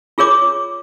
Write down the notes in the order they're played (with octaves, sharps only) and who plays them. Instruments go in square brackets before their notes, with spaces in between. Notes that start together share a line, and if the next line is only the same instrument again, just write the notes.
[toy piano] F4 G#4 A#4 C#5 D6